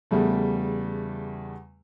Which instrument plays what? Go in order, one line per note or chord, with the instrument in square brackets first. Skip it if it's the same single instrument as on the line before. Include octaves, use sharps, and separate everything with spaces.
[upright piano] E2 C#3 G3 A3